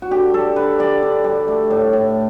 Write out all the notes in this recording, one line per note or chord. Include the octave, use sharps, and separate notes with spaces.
F#4
D3 G4
G3 A4
D3 B4
G3 D5
D3
G3
A3
A2
A2